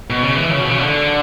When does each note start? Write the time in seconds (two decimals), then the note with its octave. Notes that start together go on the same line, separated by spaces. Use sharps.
0.10 B2
0.22 C#3
0.36 E3
0.51 C#3
0.60 B2
0.69 C#3
0.78 D3